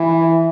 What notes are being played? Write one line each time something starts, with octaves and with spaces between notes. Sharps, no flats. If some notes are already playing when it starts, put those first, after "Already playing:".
Already playing: E3